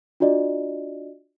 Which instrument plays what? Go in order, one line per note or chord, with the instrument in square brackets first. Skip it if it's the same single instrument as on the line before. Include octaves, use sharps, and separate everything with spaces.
[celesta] D4 F4 F#4 D5 D#5